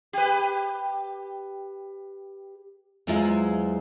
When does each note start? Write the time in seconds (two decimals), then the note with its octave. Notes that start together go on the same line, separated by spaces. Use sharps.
0.13 G4 B4
3.07 E2 F#3 G#3 E4 F4 C5